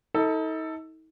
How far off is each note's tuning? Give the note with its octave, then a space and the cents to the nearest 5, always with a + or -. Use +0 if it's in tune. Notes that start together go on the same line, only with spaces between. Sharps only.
D#4 +40 A4 +15